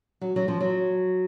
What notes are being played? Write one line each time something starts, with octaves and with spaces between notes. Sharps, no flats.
F#3
F#3
F3
F#3